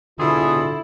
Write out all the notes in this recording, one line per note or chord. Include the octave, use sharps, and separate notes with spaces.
B2 D3 E4 F4 G#4